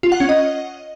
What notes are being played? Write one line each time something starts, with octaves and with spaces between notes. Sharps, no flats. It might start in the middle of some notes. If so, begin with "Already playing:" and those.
F4
F#5
C#4
D#5